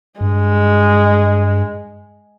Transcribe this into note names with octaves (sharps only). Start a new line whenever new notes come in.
G2 G#3